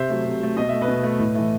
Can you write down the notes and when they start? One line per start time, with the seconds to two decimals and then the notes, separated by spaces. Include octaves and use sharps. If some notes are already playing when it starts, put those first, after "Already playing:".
Already playing: C3 C5 E5
0.09 F#3 A3
0.25 C3
0.40 F#3 A3
0.57 B2 D#5
0.69 A3 E5
0.81 B4 D#5
0.88 B2
1.03 A3
1.19 A2
1.35 E3 A3